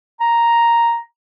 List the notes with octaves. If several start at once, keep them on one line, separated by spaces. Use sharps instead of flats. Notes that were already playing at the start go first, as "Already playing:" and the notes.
A#5